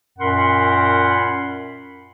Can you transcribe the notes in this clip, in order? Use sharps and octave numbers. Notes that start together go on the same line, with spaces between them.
F#2 A#2 A#4 F#5 B5 C6